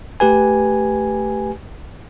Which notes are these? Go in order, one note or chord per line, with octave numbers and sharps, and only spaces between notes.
A3 G4 B4 G#5